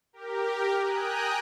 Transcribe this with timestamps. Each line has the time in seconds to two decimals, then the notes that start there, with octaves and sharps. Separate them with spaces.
0.13 G4 A#4
0.78 G5 G#5 A#5 D#6 F#6